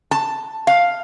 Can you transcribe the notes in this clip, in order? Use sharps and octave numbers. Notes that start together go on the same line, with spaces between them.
A5
F5